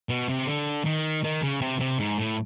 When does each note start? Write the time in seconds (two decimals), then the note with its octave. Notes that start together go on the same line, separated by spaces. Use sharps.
0.09 B2
0.29 C3
0.47 D3
0.85 D#3
1.24 D#3
1.42 C#3
1.61 C3
1.80 C3
1.99 G#2
2.18 A2